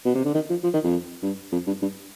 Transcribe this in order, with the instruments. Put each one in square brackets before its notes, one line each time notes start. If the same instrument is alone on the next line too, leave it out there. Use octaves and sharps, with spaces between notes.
[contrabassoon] B2
C3
D3
D#3
F3
F3
D#3
F2
G2
F2
G2
G2